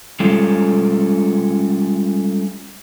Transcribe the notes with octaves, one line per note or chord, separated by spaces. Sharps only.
G3 G#3 C#4 F4 A4